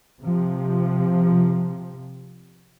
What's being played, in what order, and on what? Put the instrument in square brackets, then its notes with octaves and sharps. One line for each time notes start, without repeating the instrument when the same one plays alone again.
[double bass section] C3 F3